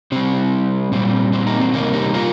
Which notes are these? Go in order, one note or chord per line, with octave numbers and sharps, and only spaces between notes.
C3 G3 C4
A#2 G3 C4
C4
A#3 D#4
C4
C3 D#3 G3 A#3 D#4
D#4 G4
F4 A#4